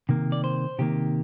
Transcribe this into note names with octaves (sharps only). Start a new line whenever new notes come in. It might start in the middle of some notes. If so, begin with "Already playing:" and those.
C3 D#3 A#3
D5
C5
C3 D#3 A#3 G4